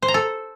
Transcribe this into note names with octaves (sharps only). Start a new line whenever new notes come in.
C5
A#5
A4